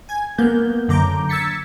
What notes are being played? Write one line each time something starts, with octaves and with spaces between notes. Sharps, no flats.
G#5 G#6
A#3 B3 G6
F#2 D3 A#5 D6 G6
E6 G#6 A6 B6 C#7